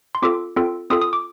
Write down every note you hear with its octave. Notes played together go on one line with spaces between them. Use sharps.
C6
C4 F4 A4 D6
C4 F4 A4
C4 F4 A4 D#6
D#6
D6